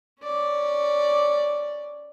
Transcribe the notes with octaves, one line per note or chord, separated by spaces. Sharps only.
C#4 D5